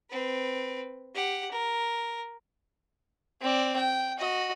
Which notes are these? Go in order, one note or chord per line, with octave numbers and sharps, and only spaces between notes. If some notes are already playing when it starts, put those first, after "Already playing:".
C4 B4
G4 F#5
A#4
C4 D5
G5
F#4 D#5